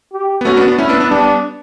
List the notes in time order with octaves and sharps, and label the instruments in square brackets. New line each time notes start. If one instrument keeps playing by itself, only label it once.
[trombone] G4
[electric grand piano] B3
[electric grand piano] A3 C#4 [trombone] F#4
[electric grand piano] B3 D4
B3 D4
[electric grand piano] A3 C#4 [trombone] E4
[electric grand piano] B3 D4
B3 D4
[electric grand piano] G3 B3 [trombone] D4